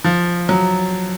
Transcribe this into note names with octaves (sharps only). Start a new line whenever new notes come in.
F3
F#3